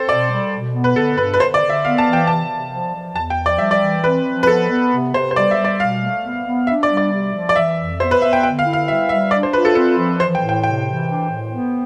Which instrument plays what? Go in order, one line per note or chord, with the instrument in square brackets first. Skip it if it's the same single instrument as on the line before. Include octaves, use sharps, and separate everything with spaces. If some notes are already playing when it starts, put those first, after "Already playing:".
Already playing: [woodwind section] C4 [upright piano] A4 C5
[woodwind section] B2 [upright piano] D5
[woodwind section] G3
B2
B3
[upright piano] B4
[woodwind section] D3 [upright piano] A4
[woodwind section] G2 [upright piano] B4
[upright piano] B4
[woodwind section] D3 [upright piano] C5
[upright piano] D5
[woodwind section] D3
[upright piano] E5
[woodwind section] B3 [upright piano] F5
[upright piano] A5
[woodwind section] E3
[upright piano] G5
[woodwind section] C3 [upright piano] A5
[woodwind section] C3
F3
F3
[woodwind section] E2 [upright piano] A5
[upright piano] G5
[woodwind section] F3
[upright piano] D5
[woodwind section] G3 [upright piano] E5
[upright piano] D5
[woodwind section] E3
[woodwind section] C4 [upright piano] B4
[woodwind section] F3
[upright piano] B4
[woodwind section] B3 [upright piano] A4
[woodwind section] B3
C3
[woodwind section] C3 [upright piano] C5
[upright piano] C5
[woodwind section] G3 [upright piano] D5
[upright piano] E5
[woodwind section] G3
[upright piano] D5
[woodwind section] B2 [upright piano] F5
[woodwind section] A3
B3
B3
[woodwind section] D4 [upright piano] E5
[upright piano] D5
[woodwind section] G3
[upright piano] D5
[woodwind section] C3
F3
[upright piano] D5
[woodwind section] E3 [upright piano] E5
[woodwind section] F2
[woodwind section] B3 [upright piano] C5
[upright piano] B4
[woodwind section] B3 [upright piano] E5
[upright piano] G5
[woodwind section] D3 [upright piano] G5
[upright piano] F5
[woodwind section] E4
[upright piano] F5
[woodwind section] G3 [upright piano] E5
[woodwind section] G3 [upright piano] E5
[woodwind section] D4 [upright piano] D5
[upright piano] C5
[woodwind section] F4 [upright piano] B4
[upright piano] A4
[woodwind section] C4 [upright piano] A4
[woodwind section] F3
[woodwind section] E3 [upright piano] C5
[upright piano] G5
[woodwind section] A2
[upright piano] G5
[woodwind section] C3 [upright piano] G5
[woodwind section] E3
D4
A2
B3